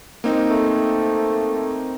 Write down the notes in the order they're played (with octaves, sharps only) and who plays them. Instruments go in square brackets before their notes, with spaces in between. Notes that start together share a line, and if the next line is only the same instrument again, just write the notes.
[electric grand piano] A#3 C4 D#4
[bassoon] A3